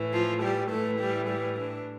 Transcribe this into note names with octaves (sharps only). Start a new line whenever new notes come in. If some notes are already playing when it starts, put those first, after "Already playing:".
Already playing: A2 E3
F3 F4
G3 G4
A2 E3 A3 A4
G3 G4
G3 G4
D4